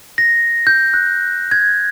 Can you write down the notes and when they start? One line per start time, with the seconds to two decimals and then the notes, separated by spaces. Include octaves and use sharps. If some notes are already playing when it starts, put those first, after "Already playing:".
0.18 A#6
0.67 G6
0.94 F#6
1.51 G#6